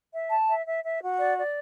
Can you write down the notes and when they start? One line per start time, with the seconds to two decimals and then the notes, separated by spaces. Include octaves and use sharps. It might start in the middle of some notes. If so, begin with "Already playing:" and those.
0.12 E5
0.30 A5
0.47 E5
0.65 E5
0.82 E5
1.01 F#4
1.18 D5
1.36 D5